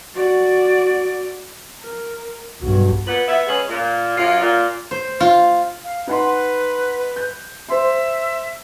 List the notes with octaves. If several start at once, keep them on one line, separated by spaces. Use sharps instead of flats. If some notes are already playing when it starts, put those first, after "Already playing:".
F#4 D5
A#4
B1 G2 F#4
A#2 B3 B4
B3 E5
G#3 C#4 G#4 B4
A#2
F#2 F4
A#2
C5
F4
F5
D#4 B4 F#5 C6
G6
C5 E5 C6